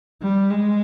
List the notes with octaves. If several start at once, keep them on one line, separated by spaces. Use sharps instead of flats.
G3
G#3